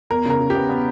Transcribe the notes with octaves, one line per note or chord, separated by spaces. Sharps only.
E2 A#4
C#3 A#4
C#3
G4
B3
B3